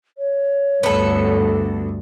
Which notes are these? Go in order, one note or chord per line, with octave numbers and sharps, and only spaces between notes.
C#5
D2 G2 B3 A4